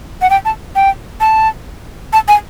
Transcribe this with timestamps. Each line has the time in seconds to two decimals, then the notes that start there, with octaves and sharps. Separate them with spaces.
0.22 F#5
0.30 G5
0.45 A5
0.75 G5
1.20 A5
2.13 A5
2.28 G#5